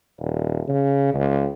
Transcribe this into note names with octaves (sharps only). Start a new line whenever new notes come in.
D#1
C#3
C#2